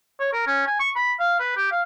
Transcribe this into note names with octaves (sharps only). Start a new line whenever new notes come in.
C#5
A#4
C#4
G#5
C#6
B5
F5
B4
G4
F5